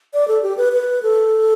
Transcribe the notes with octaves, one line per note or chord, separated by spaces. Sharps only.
D5
A4
G4
B4
B4
A4